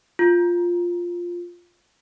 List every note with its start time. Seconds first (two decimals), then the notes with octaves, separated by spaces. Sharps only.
0.19 F4